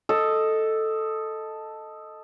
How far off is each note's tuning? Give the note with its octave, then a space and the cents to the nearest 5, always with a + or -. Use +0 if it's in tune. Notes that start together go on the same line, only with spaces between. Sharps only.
A4 +0 D#5 +0